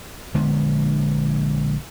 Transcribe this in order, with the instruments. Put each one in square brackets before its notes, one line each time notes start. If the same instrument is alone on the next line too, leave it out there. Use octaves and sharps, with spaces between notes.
[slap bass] A#1 D3 G#3 B3